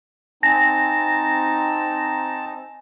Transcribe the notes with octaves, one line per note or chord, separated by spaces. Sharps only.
C4 D#4 G#5 A5 A#6